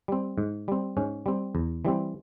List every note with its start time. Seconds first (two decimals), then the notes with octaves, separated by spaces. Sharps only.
0.08 G3 C4
0.38 G#2
0.68 G3 C4
0.97 G#2 C#4
1.26 G3 C4
1.55 E2
1.85 E3 G3 C4